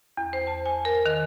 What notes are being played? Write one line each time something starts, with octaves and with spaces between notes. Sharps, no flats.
E2
C5
A5
G#5
A#4
D#3